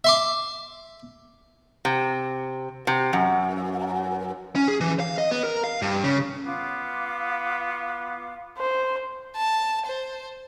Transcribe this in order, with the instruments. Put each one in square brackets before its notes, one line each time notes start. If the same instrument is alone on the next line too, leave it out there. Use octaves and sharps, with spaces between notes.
[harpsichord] E5 C6 D6
[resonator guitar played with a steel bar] C3
C3
F#2
[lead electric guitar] C#4
G#4
E3
F5
D#5
B3
A#4
F5
G2
C#3
[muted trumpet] B3 [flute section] F4 F5 D6
[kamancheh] C5
[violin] A5
C5